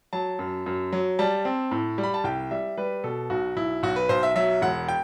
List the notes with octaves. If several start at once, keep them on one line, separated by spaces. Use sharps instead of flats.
F#3 A5
F#2
F#2
F#3
G3 A5
C4
A2
G3
B5
A5
C2 G5
G3 E5
G3 B4
B2 A4
B1 F#4
B1 E4
B1 F#4
B4
B1 C5
E5
F#3 E5
E1 F#5
G5